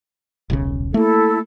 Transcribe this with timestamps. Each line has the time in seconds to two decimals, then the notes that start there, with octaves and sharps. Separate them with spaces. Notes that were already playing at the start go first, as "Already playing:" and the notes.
0.50 D#1 B1 C#3
0.94 A3 A#3 E4 A4